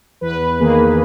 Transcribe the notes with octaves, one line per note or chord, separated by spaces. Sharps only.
E2 B4
D#3 A#3 G#4